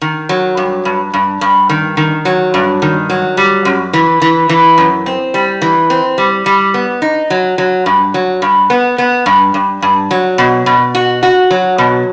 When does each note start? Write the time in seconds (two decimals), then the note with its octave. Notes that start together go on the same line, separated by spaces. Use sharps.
0.02 D#3
0.29 F#3
0.57 G2
0.85 G2
1.14 G2
1.41 G2
1.69 D#3
1.97 D#3
2.25 F#3
2.54 G2
2.82 D#3
3.10 F#3
3.37 G3
3.65 F#2
3.93 E3
4.22 E3
4.49 E3
4.78 F#2
5.06 C4
5.34 G3
5.62 E3
5.90 C4
6.18 G3
6.46 G3
6.74 B3
7.02 D#4
7.30 F#3
7.58 F#3
7.86 G2
8.14 F#3
8.42 G2
8.70 B3
8.98 B3
9.26 G2
9.54 G2
9.82 G2
10.11 F#3
10.38 B2
10.66 B2
10.95 F#4
11.23 F#4
11.51 F#3
11.78 B2